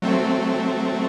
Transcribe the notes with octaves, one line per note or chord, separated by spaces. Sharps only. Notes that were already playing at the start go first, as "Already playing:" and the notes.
F#3 A3 C4